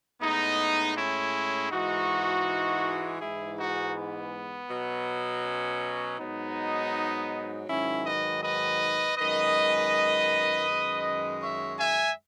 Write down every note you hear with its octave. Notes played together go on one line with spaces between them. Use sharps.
A2 G#3 B3 D#4
C#4 E4
G#2 E3 G#3 D#4 F#4
G#2 E3 G#3 E4 G#4
D#4 F#4
B3
B2 F#3
C#4
G#2 F#3 B3 D#4
G#2 D#3 F#3 C#4 E4
B4 D#5
B4 D#5
F#2 D#3 G#3 B4 D#5
F#2 D#3 G#3
C#5 E5
E5 G#5